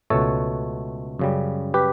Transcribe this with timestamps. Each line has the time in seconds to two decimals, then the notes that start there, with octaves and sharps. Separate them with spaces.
0.10 C#2 B2 A3 A4 C#5
1.19 F#2 C#3 G3
1.74 G4 B4